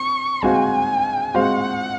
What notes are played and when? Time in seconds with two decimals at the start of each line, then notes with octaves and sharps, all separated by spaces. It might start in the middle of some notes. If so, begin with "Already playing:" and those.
Already playing: C4 C#6
0.43 G#3 C4 F#4 C5 F5 G#5
1.34 G#3 C4 F#4 C5 F5 F#5